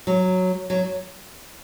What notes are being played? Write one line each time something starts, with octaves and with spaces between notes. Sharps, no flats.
F#3
F#3